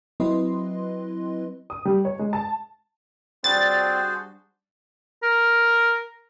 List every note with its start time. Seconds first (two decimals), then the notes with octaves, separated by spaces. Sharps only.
0.20 F#3 C4 E4 B4 D#5 C6
1.70 D#6
1.85 G3
2.05 C#5
2.19 G#3
2.33 A5
3.44 G3 C4 D4 F#4 G#4 C5 A6
5.23 A#4